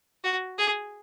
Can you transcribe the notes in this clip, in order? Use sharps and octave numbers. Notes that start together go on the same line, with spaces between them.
F#4
G#4